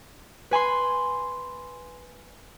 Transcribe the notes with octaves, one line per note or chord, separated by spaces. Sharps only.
B4 G#5 B5 C6